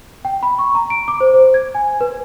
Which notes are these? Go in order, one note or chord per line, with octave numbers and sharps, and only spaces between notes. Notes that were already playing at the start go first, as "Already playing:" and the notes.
G5
B5
C#6
A#5
D7
D6
C5
C5
G#6
G#5
B4